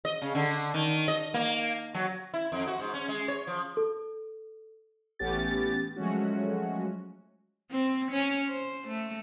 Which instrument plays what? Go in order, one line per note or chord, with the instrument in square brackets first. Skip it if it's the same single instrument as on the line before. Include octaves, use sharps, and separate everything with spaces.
[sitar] D#5
C#3
D3
D#3
D#5
A#3
F#3
E4
F2
F#4
G#2
C#4
G#3
C#5
F3
[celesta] A4
[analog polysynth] A1 A3 B3 C#4 G4 A6
F3 F#3 G#3 A3 C#4 F#4
[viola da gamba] C4
C#4
C5
A3